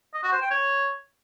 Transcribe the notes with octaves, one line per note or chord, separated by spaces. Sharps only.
D#5
F#4
C5
G5
C#5